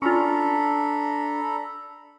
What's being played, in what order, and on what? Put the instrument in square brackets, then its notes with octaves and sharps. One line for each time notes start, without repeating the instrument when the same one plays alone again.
[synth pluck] C#4 F4 [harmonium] D4 [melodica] A4 A#5 B5